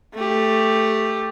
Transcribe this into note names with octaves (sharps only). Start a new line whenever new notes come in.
A3 G4